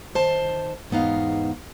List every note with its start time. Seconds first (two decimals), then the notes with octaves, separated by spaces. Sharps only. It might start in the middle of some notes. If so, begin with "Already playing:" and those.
0.15 D#3 C5 A5
0.90 E2 G#2 B3 D#4 F5